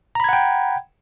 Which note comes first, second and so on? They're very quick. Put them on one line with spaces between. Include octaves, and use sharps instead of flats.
A#5 B5 G#6 F#5 G5